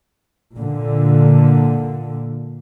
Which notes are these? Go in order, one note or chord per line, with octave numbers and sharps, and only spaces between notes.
A#2 D3